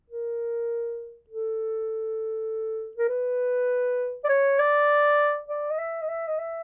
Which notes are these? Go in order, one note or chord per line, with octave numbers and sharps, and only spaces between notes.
A#4
A4
A#4
B4
D5
C#5
D5
D5
D#5
E5
D#5
E5
D#5
E5